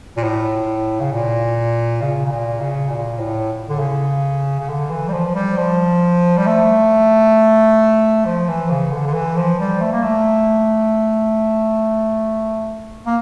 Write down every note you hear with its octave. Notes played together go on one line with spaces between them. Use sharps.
A#2
A2
C#3
A#2
C#3
C#3
A#2
C#3
A#2
A2
D3
C#3
C#3
D3
E3
G3
F3
G3
F3
G3
A3
F3
E3
C#3
D3
D3
E3
F3
G3
A3
A#3
A3
A#3